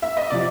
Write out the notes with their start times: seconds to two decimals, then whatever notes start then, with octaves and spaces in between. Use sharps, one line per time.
0.02 E5
0.17 D#5
0.30 C3 F3 D5